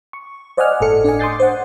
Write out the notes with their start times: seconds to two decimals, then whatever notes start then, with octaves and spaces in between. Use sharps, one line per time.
0.13 C#6
0.57 C5 D5 D#5 F#5 G#5 F6
0.81 G1 A2 A4 C#7
1.04 D4 D5 D#5 G#5
1.19 C6 D6 D#6 G6 A6 C7
1.40 C5 F#5